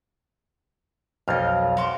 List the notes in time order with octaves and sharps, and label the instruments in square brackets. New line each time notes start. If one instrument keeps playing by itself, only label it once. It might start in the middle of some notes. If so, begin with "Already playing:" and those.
[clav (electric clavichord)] B1 F2 [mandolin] D#5 F5
[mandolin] F#4 C6 D6 [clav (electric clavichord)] F5